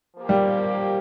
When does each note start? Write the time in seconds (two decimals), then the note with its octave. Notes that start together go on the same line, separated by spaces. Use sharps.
0.17 F3 A#3 G4
0.29 G3